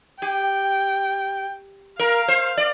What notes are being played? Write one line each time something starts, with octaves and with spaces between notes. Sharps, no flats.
G4 G5
A#4 F5
C5
D5